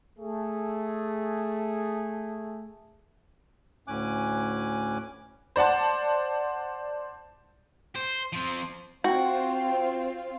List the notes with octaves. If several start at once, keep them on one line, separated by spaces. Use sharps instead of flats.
A3 G#4
D2 A2 C#4 G#5 D6 F#6
C5 D5 F#5 A5
C5
F3 C4
C4 F4 F#4 G5